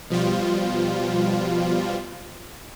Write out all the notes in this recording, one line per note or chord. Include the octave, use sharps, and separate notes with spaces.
B2 F3 G3 F4